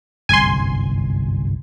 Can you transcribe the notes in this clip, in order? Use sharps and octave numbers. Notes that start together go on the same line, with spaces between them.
G1 C2 F#2 G#5 C6